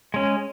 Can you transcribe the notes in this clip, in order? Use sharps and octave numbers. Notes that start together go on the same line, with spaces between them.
G#3 C#4